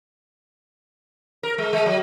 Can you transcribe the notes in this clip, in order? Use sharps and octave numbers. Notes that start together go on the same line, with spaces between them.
A#4
G#3
G#3
F#3